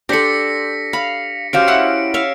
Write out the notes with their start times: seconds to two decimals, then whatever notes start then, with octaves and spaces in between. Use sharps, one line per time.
0.09 D4 G4 A4 C5 D5 A#6 B6 C#7
0.93 F5 B5
1.53 C#4 F#4 G4 C5 F5 C7 D7
1.68 E4 F#5 F6 C7
2.14 C#5 E5 F5